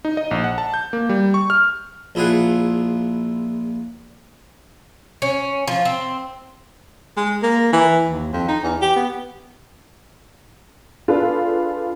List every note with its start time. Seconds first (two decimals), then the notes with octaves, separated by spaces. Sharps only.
0.05 D#4
0.17 D#5
0.31 A#1
0.44 F#5
0.58 A5
0.74 G6
0.93 A#3
1.09 G3
1.34 C#6
1.50 F6
2.15 A#1 E4 F4 G#4 F#5
5.22 C#4
5.68 F3
5.85 C4
7.17 G#3
7.42 A#3
7.73 E3
8.08 D#2
8.32 F2
8.48 D#4
8.63 E2
8.81 G4
8.96 B3
11.08 D4 F4 G#4 A4 B4